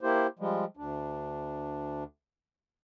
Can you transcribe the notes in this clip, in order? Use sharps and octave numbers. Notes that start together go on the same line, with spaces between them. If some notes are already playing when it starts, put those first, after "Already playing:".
A#3 E4 G4 C5
F3 G3 G#3
D2 D4